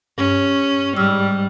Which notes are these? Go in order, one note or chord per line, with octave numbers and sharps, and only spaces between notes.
G2 C#4
G#2 G3 E6 F6